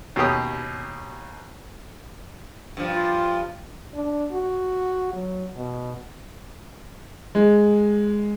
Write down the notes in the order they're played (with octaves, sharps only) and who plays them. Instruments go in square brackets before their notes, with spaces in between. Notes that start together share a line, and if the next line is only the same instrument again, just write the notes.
[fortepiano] D#2 B2 C#4 G4 D#6
[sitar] G2 F3
[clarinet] F4
[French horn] D4
F#4
F#3
B2
[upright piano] G#3